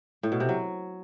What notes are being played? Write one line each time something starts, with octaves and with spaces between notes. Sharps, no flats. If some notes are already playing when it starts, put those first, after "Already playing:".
A2
B2
C3
F#3